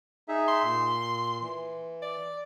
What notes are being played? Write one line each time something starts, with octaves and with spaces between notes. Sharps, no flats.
D#4 G#4 E5
C6
A#2
E3
D5